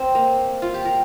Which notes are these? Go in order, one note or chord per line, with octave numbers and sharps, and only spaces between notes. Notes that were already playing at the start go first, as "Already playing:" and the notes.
Already playing: C4
A#3
F4
G4
A#4